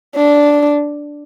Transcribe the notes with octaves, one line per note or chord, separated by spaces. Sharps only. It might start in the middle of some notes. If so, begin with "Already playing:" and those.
D4